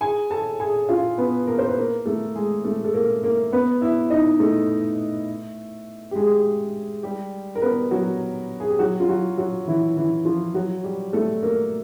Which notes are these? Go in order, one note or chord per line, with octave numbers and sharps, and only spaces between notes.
G#4 G#5
A4 A5
G#4 G#5
F4 F5
B3 B4
A#3 A#4
C5
B4
A#3 A#4
A3 A4
G#3 G#4
A3 A4
A4
A#3 A#4
A#3 A#4
B3 B4
E4 E5
D#4 D#5
A3 A4
G4
G#3 G#4
G3 G4
A#4
B3 B4
F#3 F#4
G#4
G4
F#3 F#4
F4
F#3 F#4
F#3 F#4
E3 E4
E3 E4
F3 F4
F#3 F#4
G3 G4
A3 A4
A#3 A#4